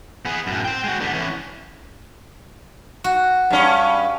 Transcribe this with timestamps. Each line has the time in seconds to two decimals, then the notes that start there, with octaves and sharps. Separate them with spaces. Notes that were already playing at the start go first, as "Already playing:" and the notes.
0.25 B3 G#4
0.47 F#2 A2
0.65 C5 G5
0.84 G#3 F#4
1.00 D3 B3
1.13 E3 C#4
3.04 F#4
3.51 G2 C#4